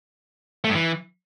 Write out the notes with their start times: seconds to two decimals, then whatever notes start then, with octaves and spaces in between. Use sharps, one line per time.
0.64 A3
0.70 G2
0.75 E3